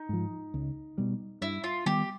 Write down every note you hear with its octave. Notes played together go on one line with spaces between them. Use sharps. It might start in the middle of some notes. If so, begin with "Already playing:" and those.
Already playing: D#4
G#2 F3
C#2
B2 G3
G2 E4
F4
D#3 G3 B3 G4